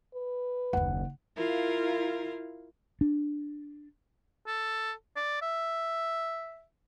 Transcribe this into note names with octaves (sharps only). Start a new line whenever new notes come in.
B4
F#1 D#2 F#5
E4 F4 A#4 F5
D4
A4
D5
E5